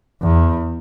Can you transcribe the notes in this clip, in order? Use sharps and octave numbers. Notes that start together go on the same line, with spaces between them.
E2